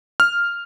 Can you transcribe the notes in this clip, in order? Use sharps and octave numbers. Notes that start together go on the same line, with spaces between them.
F6